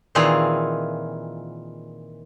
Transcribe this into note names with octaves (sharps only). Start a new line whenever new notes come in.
A#2 D#3 E3 C4 F4 G#4